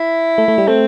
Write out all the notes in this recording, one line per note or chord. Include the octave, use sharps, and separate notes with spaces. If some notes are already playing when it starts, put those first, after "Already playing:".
Already playing: E4
A3
A3
G3
A3 C4